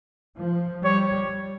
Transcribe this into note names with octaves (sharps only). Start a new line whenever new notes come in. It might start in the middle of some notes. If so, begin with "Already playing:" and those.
F3
G3 C#5